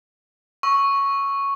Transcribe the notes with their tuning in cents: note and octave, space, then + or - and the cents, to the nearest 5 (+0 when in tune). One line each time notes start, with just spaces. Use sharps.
C#6 +0 E6 +0